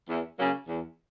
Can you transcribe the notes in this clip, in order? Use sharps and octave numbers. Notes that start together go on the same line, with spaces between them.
E2
C#3 F#3 A#3
E2